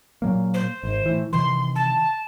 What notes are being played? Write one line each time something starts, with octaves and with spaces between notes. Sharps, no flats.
A#2 F#3 A#3
C5
G#1
A2 E3
C3 D#3 E3 C6
A5